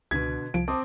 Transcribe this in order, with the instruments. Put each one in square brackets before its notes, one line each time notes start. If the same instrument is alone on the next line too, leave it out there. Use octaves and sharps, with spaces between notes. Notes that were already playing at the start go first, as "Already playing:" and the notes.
[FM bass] C#2 [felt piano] B2 D3 B6 [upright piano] G#6
[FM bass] C2 [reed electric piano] F3 [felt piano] D7
[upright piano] C4 [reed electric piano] A5 D6 D#6